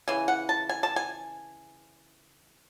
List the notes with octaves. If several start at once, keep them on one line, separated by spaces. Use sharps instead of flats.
C#3 E3 G#5
F#5
A5
G#5
A5
G#5